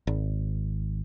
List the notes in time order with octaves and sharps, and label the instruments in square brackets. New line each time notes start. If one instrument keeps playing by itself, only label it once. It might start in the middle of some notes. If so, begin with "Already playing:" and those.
[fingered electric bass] G#1